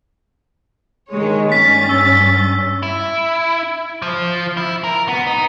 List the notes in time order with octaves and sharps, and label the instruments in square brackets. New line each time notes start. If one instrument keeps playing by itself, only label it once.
[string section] D#3 G#3 C#5
[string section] G2 C#4 A6 [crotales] B6
[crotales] E6
[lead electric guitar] E4
F3
E4
A#4
B3
D#4